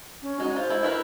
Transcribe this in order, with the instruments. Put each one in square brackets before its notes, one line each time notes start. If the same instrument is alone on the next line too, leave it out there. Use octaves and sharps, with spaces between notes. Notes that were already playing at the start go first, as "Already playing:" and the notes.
[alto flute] C#4
[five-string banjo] G#3 D#4 [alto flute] F#4
[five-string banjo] F4 [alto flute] C5
[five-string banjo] G#3 E4
E4 A#4 B4